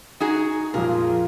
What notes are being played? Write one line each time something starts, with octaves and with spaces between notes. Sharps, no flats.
D#4 F#4 G#4
F2 A#2 F4 G#4 A#4